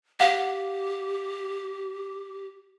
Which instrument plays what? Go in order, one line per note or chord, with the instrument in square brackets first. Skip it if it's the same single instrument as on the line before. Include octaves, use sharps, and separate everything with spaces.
[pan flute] G4 [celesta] F5 F#5